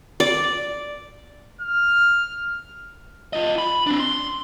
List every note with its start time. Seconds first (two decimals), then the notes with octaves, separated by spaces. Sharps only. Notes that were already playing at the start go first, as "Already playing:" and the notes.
0.20 D5
1.61 F6
3.33 F4 D#5
3.58 B5
3.87 C4 D4
4.00 C6